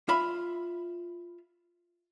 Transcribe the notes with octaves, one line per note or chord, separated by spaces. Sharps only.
F4 E5 B5